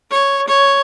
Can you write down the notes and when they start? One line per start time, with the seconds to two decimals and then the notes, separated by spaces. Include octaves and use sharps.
0.11 C#5
0.47 C#5